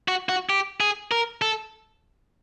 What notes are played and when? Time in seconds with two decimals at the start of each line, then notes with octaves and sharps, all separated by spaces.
0.08 F#4
0.29 F#4
0.50 G4
0.80 G#4
1.11 A#4
1.42 A4